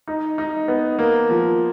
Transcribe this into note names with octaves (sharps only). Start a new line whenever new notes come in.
D#4
D#4
B3
A#3
F3